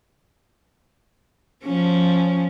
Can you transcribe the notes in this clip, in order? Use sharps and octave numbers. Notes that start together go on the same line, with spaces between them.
F3 C#4